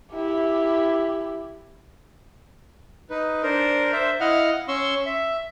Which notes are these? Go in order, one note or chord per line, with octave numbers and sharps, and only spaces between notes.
E4 G4
D#4 B4
D4 A#4 C5
C5 E5
E4 D#5 F5 F#5 F6
C#4 C6 C#6 E6
E5